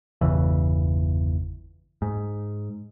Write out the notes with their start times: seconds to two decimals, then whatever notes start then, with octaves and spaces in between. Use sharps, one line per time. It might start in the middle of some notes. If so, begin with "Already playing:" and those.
0.21 G1 E2 C#3 E3
2.02 G#2